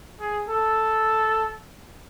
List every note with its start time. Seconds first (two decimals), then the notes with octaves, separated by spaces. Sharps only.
0.21 G#4
0.49 A4